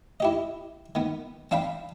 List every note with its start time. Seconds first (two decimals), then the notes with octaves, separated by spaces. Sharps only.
0.20 E4 G4 D#5
0.95 D#3 B3
1.51 C4 D4 F5 G5 B5